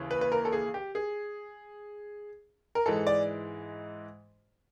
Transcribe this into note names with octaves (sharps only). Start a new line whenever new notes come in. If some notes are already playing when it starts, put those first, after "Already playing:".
Already playing: D#2 C#3 E3
B4
B4
A#4
A4
G#4
G4
G#4
A#4
G#2 E3 G#3 A4
D5